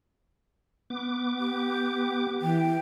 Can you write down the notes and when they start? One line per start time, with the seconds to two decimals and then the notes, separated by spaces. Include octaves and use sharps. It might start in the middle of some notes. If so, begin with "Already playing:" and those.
0.90 B3 D6
1.39 G4
2.42 E3 G5